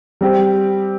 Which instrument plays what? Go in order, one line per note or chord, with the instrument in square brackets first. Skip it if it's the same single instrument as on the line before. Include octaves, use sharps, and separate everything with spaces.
[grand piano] G3 C4 G4